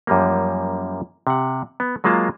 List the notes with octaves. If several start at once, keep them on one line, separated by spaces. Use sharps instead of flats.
F#2 F3 G3 A#3
C3 F#5
B3
F#3 G#3 A#3 F4 A5